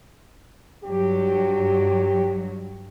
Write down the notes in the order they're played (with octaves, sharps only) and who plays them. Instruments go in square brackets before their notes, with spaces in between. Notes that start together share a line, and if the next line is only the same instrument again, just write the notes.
[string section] G2 F#3 [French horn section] G4